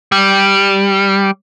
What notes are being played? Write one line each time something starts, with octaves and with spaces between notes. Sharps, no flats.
G3